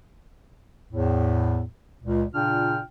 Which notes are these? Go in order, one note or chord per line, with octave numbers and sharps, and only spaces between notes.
E2 A2
C#2 A#2
A#2 C#3 D4 F4 G5 F6